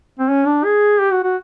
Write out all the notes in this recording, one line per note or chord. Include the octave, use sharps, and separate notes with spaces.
C4
C#4
D4
G#4
G4
F#4
F#4